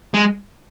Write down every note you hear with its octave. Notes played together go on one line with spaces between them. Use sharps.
G#3